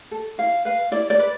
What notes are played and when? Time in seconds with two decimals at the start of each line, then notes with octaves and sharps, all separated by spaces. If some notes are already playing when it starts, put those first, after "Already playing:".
0.11 A4
0.38 E4 F5
0.65 B4 F5
0.91 E4 D5
1.10 D5
1.19 B4